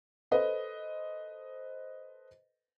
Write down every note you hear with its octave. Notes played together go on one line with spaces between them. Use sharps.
A4 B4 C5 D#5